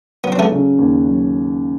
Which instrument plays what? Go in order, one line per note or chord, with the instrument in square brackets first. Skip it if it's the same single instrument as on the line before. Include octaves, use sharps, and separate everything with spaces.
[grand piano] F#3 [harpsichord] B3
[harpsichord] C4
A3 B3
[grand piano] C#3
D#2
F#3